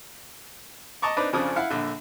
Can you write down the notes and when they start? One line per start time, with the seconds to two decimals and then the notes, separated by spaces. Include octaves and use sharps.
1.02 D#5 A5 A#5 C#6 D6
1.17 C4 D4 D#4 B4 D5
1.33 F2 C#3 F3 C#4 D4 D#6
1.56 E4 F5 F#5
1.70 A#1 D3